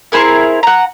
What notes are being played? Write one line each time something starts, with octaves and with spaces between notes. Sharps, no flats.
C4 E4 G#4 A#4
F#5 A#5